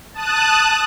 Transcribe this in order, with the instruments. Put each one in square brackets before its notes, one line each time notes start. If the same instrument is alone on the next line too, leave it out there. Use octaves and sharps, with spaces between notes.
[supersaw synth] A5 D#6 F#6